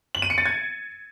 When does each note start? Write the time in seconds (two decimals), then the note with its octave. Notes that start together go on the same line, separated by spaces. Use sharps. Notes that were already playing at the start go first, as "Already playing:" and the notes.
0.15 F#7
0.22 D#7
0.30 C#7
0.38 A6
0.46 G#6